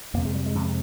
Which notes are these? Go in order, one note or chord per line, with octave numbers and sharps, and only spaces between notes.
F2 C3 A#3
G#3
G3
G#3
F2 C3